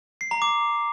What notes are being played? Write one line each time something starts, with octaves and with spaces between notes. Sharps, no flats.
C7
A#5
D6